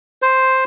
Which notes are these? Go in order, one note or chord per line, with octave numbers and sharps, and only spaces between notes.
C5